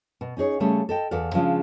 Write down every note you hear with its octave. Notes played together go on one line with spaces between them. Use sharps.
B2
C#4 D#4 G#4 C#5
C#3 G3 A3 C#4 G#4
A4 D#5 G5
E2 A4 D5 F5
C#3 F3 G#3 D4